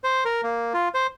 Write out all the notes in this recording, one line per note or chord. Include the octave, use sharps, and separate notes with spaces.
C5
A#4
A#3
F4
C5